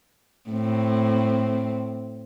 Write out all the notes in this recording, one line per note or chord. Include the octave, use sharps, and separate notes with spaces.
A2 C4